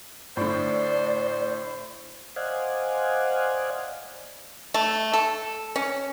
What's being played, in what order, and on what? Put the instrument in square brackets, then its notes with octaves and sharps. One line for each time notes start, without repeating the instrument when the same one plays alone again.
[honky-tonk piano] A2 D3 [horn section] C5 [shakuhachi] D5
[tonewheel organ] C5 D5 D#5 F5 F#5 G#5
[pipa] A3
A4
C#4